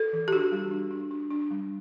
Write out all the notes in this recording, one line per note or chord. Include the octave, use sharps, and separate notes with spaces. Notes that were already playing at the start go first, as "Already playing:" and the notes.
Already playing: A4
E3
G4
D4 F#4
G3
D4
D4
D4
D4
G3